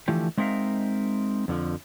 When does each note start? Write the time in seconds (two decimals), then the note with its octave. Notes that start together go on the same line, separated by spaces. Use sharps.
0.08 D3 E3 F3 A3 G4
0.38 G#3 C4 D#4 A#4 E5 F5
1.48 F2 D3 F3